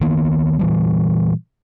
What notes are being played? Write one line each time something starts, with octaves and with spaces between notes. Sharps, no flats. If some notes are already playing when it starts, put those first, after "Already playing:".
D#3 A#3 B3
A#2 E3 G3